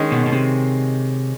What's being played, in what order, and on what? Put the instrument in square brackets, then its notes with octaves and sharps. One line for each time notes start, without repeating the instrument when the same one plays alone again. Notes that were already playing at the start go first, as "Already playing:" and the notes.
Already playing: [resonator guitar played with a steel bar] D#3 G#3 C#4
[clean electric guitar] B2
B2
C3